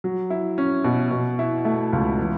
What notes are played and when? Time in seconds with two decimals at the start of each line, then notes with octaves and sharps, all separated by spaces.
0.04 F#3
0.30 E4
0.58 C#4
0.84 B2
1.11 B2
1.39 E4
1.65 A3
1.93 C#2
2.19 E3